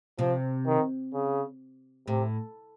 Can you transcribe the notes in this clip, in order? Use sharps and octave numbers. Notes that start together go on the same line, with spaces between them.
C3 F3
D#3
C#3
A2 C3